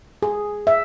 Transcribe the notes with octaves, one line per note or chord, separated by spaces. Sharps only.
G#4
E5